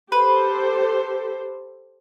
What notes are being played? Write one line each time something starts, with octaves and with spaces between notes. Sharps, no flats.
G4 A4 B4 C5